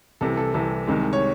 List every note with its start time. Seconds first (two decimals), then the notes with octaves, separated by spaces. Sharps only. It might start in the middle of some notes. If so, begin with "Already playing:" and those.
0.21 C2 C3 E3 A4
0.37 A4
0.54 C2 C3 E3 A4
0.87 C2 C3 D#3 G#3
1.13 C#5